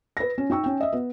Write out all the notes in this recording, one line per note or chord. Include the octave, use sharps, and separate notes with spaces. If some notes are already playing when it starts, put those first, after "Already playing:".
B4 A#6
C#4
D#4 G5 C#6 E6
C#4 G5
D#5 E5
B3